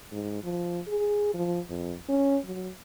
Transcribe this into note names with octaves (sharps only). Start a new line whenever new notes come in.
G#2
F3
G#4
F3
F2
C#4
F#3